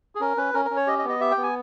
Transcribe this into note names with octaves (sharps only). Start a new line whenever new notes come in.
G#4
C#4 A#4
C#4 B4
C#4 A#4
A#4
C#4
C#5
G4 D#5
D#5
B3
D#5
G4 E5
G5
B3
G#5